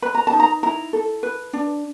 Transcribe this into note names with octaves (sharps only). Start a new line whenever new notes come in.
B4 B5
A#5
A5
D#4
A#5
E4 A#5
A4
B4
D4